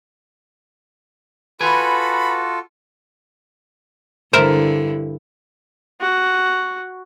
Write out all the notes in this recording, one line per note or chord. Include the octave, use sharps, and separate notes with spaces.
F4 F#4 A4 B4 G#5 B5
G2 D3 E4 A#4 C5 E5
F#4